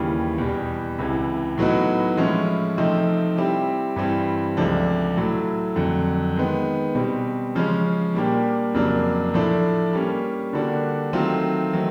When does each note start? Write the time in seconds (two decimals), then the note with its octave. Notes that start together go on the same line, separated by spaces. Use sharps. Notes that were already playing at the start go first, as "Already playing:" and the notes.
Already playing: D#2 C#3 E3 G3
0.38 E2 B2 G3
0.98 C#2 C3 E3
1.58 A2 F#3 B3 D#4 F#4
2.17 A2 F3 G#3 C#4 E4
2.77 C3 F3 A3 C4 D#4
3.37 G3 C4 E4 G4
3.96 G2 E3 G3 C4
4.57 C#2 C3 F3 A3 D4
5.17 A2 F#3 A3
5.76 F2 D3 F#3
6.36 D#3 G#3 B3
6.95 B2 G3 C4
7.55 C#3 F3 G#3 C#4
8.14 A#2 G3 A#3 D4 G4
8.74 F2 C#3 F#3 A#3 D4
9.34 A2 F3 A3 D4
9.93 G3 A#3 C#4
10.53 D3 G3 A#3 D4 F#4
11.13 D#3 F#3 A3 C4 F4
11.73 D#3 F#3 A3